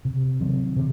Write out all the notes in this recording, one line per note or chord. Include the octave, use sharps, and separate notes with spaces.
C3
D#3 F#3 C4
C3